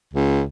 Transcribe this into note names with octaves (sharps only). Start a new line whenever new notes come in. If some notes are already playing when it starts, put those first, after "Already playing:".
C#2